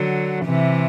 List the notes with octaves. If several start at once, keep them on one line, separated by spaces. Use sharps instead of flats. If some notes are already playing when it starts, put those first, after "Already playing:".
Already playing: D3 F#3
C3 E3